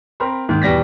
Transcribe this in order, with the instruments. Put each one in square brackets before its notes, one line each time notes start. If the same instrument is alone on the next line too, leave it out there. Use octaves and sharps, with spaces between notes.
[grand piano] C4 A#4 B5 C6
G#2 D#3 A#3
E2 B2 G3 A#6 B6